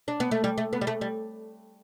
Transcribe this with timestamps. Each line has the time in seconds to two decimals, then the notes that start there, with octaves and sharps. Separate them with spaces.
0.08 D4
0.20 B3
0.31 A3
0.44 G3
0.58 A3
0.73 B3
0.81 G3
0.87 A3
1.01 G3